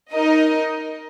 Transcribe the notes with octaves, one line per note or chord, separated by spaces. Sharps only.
D#4 A#4 D#5